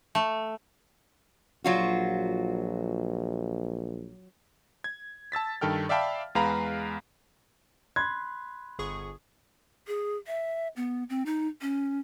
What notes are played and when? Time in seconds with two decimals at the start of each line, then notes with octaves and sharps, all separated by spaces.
0.15 A3
1.64 A#1 F#3 F4 F#4
4.84 G#6
5.32 A5 E6 A6 B6
5.61 G2 D#3 A4 G5 F6
5.89 D5 E5 F5 G5 A5 B5
6.35 E2 G#3 B4 F5 A#5 B5
7.96 B5 C6 F#6 G#6
8.79 G1 G#4 C#6
9.87 G#4
10.27 E5
10.76 B3
11.10 C4
11.26 D#4
11.61 C#4